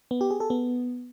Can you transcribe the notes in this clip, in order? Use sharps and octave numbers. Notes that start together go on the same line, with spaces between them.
B3
G4
G#4
A4
B3